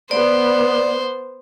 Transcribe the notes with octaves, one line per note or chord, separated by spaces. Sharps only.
B3 C5 D5